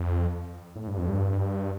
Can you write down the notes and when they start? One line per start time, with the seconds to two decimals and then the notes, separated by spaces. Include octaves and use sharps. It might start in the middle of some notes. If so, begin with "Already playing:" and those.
Already playing: F2
0.76 A2
0.87 G2
0.98 F2
1.09 G2